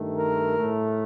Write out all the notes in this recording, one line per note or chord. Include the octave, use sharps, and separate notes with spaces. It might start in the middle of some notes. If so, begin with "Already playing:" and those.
Already playing: G2 D#3 A3
A#4
A2 A3